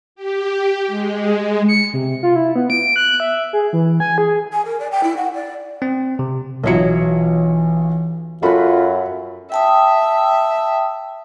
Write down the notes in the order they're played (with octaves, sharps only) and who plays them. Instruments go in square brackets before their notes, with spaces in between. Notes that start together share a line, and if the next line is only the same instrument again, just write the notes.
[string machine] G4
G#3
[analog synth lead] C#7
C3
F4
E4
B3
D7
F#6
E5
G#4
E3
G#5
G#4
[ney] G#5
A#4
D5
G5
E4
F#5
D5
[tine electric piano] C4
C3
[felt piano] B1 F4 C#7 [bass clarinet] E3 [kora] F#3 E4 D#5
[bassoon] F#2 [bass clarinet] F4 [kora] F#4 B4 [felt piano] A4 B5
[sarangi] E5 [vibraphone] G5 A5 D#6